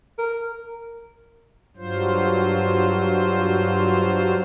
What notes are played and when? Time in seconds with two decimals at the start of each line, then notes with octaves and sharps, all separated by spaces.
0.18 A#4
1.77 G2 F#3 F4 C5